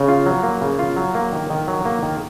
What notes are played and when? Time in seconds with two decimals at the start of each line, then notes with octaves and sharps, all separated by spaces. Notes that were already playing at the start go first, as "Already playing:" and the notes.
Already playing: C#3
0.09 F4
0.26 F#3
0.43 A#3
0.61 C#3
0.79 F4
0.96 F#3
1.15 A#3
1.32 D#3
1.50 D#3
1.68 F#3
1.85 A#3
2.02 D#3